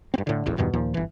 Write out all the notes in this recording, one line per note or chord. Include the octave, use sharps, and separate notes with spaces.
G2 C4
A2 D3
D#1 A1 E2
E2 G2 B2 D#3
D#2 A#2 F3
G1 E3